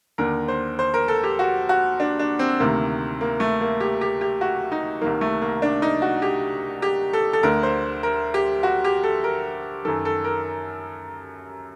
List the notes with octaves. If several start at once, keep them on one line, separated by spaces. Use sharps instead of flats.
D#2 D3 A#4
C5
C5
A#4
A4
G4
F#4
F#4
D4
D4
C4
D2 C3 D#3 A#3
A#3
A3
A#3
G4
G4
G4
F#4
D#4
C2 C3 D#3 A#3
A3
A#3
D4
D#4
F#4
G4
G4
A4
A4
D2 D3 A#4
C5
A#4
G4
F#4
G4
A4
A#4
F#2 D#3 A4
A4
A#4